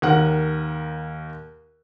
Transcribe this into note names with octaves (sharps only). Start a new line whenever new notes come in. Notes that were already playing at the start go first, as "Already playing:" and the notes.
D#2 A#4 F#5